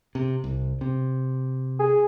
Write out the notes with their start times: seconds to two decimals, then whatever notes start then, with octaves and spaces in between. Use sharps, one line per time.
0.15 C3
0.44 C2
0.81 C3
1.79 G#4